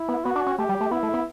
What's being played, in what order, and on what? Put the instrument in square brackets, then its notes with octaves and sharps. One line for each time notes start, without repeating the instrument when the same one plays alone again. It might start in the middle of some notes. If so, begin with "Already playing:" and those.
Already playing: [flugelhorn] E4
[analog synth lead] B3
[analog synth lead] B3 [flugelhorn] F#4
[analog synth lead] D4
C#4
[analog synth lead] A3 [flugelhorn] G4
[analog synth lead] G3
A3
[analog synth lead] B3 [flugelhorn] E4
[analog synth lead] A3
B3